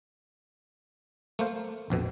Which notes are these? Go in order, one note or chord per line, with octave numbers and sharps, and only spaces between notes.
A3 A#3 C5 F5
A#1 F2 B2